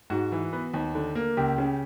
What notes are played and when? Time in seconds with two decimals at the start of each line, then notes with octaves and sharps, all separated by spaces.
0.10 G#2 F#4
0.32 E3
0.53 B3
0.74 D#2
0.95 D3
1.15 A#3
1.37 C#2 G4
1.58 C#3